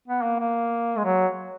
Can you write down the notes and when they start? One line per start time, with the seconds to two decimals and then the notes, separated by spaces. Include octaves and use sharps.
0.08 B3
0.23 A#3
0.40 A#3
0.97 G#3
1.05 F#3